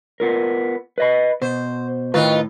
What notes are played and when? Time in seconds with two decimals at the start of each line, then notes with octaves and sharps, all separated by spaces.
0.20 B3 F4 A#4
0.98 B4 D#5 B5
1.42 B2 C5
2.14 A2 D#3 F4 B4